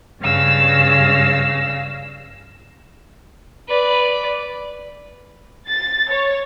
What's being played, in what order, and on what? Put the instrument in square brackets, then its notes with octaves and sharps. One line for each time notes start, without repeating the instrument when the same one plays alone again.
[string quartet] G2 C#3 F5 E6 A#6
[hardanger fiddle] B4 D5
[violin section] A6
C#5